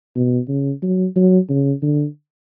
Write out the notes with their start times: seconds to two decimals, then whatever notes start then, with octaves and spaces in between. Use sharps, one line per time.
0.16 B2
0.48 C#3
0.82 F#3
1.16 F#3
1.49 C#3
1.82 D3